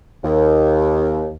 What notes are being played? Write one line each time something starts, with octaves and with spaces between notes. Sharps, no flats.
D#2